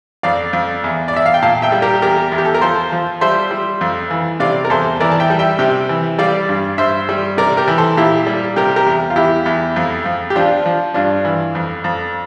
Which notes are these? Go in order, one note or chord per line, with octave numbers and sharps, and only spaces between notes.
F2 D5 F5
F2
E2
D5
E2 E5
F5
G5
A#2 F5 A5
E5 G5
G3
G4 A#4
E2 G4 A#4
E2
G4
A4
A#4
F3 A4 C5
F3
G3 C5 E5
G3
F2
E3
C3 D5 F5
A#4
E2 A4 C5
E3 A#4 D5
A5
E5 G5
G3
E5 G5
C3 E5 G5
E3
G3 D5 F5
G2
G2 C5 E5
G3
C3 A#4 D5
G4 A#4
E3
A4 C5
A#2 E4 G4
G3
C3 G4 A#4
G4 A#4
E2
F4
E2 E4 G4
E2
F2
F2
G4
F3 D4 F4
F3
G2 D4 F4
E3
F2
F2